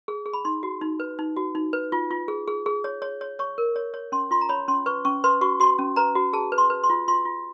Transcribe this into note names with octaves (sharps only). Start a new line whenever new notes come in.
G#4
G#4
B5
D#4 C6
F#4
D#4
B4
D#4
F#4
D#4
B4
F4
F4
G#4
G#4
G#4
C#5
C#5
C#5
C#5 C#6
A#4
C#5
C#5
C#4 C6
F4 C6
A#5
C#5 B5
C#4 C6
B4 C#6
C#4 C#6
B4 C6
F#4 C#6
F#4 C6
C#4
B4 A#5
F#4
G#4 A5
B4
C6
B4
C6
F4
F4 C6
F4